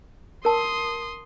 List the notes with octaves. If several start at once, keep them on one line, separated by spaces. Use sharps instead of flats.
A#4 A5 C6 D#6